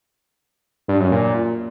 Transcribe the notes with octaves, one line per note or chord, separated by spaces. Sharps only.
G2
F#2
A#2